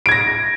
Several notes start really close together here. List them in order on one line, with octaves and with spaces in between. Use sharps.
D7 G#6 A#6